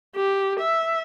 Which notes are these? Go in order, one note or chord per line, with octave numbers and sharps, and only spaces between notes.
G4
E5